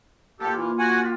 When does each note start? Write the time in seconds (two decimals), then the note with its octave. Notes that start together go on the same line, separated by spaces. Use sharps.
0.40 A#2 A#3 G4 A4
0.54 E3
0.79 F#4 F#5 G#5
1.01 F4 G4